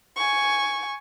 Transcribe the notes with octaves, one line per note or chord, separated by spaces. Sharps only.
G#5 C#6